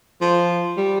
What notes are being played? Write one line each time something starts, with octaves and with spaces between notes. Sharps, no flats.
F3
G3